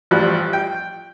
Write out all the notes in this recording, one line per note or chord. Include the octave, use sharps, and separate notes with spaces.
A1 F3 G3 F#6
G5